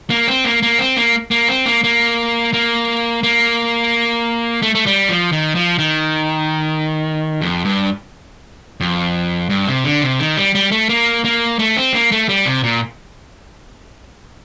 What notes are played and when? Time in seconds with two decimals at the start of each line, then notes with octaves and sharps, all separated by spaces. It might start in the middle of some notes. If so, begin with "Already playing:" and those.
0.10 A#3
0.27 C4
0.45 A#3
0.62 A#3
0.79 C4
0.97 A#3
1.31 A#3
1.48 C4
1.66 A#3
1.84 A#3
2.53 A#3
3.23 A#3
4.62 A3
4.75 A3
4.86 G3
5.09 F3
5.32 D#3
5.55 F3
5.79 D#3
7.41 F2
7.65 G2
8.81 F2
9.50 G2
9.67 C3
9.84 D3
10.02 C3
10.20 D#3
10.37 G3
10.55 G3
10.71 A3
10.89 A#3
11.25 A#3
11.59 A3
11.77 C4
11.94 A#3
12.12 A3
12.29 G3
12.47 C3
12.63 A#2